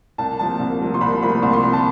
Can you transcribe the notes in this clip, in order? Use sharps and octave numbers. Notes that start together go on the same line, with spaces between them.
C2 A5
C3 F3 A#3 A5
C2
C3 F3 A#3
C6
C2 B5
C3 F3 A#3 B5
C2 C6
C6
C3 F3 A#3 B5
A5